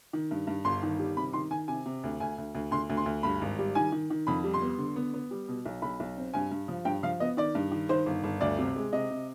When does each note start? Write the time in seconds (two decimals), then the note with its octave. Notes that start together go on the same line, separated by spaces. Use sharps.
0.13 D#3
0.31 G2
0.47 G2
0.65 G1 C6
0.83 D#3
0.99 G3
1.17 C3 B5
1.33 D#3 C6
1.51 D#3 G#5
1.68 C3 G#5
1.86 C3
2.04 D2
2.20 D2 G#5
2.38 D2
2.55 D2
2.71 D2 C6
2.90 D2
2.97 C6
3.06 D2
3.23 G2 B5
3.41 G#1
3.59 G3
3.75 D#3 G#5
3.92 D#3
4.10 D#3
4.27 F2 B5
4.44 G3
4.54 C6
4.61 B3
4.78 D3
4.96 B3
5.14 B3
5.31 G3
5.48 B2
5.66 B1
5.82 B1 B5
6.00 B1
6.17 C4
6.34 G2 G#5
6.51 G2
6.68 F3
6.85 G2 G5
7.03 F3 F5
7.20 B3 D#5
7.37 D#3 D5
7.55 G2
7.71 D#3
7.89 D#3 C5
8.06 G1
8.23 G1
8.41 D2 D5
8.59 C3
8.76 G#3
8.93 C3 D#5
9.11 C3